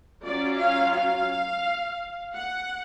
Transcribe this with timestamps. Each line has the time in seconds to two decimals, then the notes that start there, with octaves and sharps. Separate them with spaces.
0.24 F#3 C#4 F4 D5
0.59 F5
0.94 F5
2.35 F#5